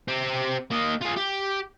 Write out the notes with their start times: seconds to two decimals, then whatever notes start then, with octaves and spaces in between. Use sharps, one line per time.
0.08 C4 G4
0.71 A#3 D#5
1.02 F4 G#4
1.17 G4